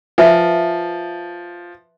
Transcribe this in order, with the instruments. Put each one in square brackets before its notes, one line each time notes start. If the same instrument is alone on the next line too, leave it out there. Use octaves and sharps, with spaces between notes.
[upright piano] F3 [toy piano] B4 E5 G#5